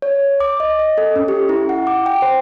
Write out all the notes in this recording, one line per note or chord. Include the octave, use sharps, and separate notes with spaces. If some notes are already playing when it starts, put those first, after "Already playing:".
C#5
D6
D#5
D#5
A4
C#4
G4
E4
F#5
D6
G5
C5